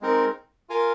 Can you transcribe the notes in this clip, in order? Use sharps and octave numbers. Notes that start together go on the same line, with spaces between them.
G#3 C4 D#4 A#4
F4 A#4 F5 G#5